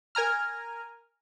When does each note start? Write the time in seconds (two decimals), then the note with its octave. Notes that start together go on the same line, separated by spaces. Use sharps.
0.15 A#4 G#5 A#5 F6